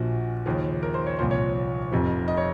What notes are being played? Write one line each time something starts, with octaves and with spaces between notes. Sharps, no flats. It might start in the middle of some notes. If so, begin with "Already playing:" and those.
Already playing: A#1 A#2 F3 F#4
D#2 C#3 F3 G#4
A#4
C5
C#5
C2 A#2 F3 C5
C#5
F1 F2 C3 F3
D#5
C#5